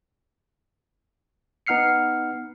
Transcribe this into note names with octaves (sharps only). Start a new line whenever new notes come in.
B3 D#4 F#5 F6 C7 C#7